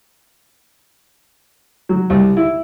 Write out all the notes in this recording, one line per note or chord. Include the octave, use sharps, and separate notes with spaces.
F#3
C2
E4